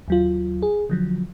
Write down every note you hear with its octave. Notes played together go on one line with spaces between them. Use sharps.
D#2 F#3 F4
G#4
D3 F3 F#3